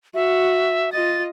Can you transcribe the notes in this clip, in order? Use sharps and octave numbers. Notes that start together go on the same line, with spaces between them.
F#4 E5
F4 D#5 A6